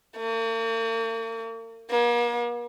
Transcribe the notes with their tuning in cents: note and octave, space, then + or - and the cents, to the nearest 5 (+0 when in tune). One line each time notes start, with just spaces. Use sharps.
A#3 -45
A#3 +40